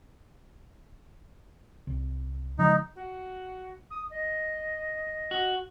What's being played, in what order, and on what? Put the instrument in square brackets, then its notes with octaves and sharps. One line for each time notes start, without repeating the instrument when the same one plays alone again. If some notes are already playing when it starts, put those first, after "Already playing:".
[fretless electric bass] C2
[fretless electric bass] C#3 F3 G#3 [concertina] D#4
[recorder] F#4
D#6
D#5
[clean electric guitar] F#4